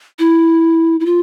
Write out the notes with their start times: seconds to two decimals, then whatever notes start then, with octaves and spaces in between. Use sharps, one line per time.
0.19 E4
1.00 E4
1.06 F4